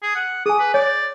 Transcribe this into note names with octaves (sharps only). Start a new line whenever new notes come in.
G#4
F#5
G#4 G#5 D#6
B4
C#5 D5 G6